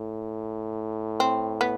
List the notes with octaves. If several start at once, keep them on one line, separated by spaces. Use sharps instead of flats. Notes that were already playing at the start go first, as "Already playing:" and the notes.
Already playing: A2
C4
B3